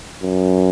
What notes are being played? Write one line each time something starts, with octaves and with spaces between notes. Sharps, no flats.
F#2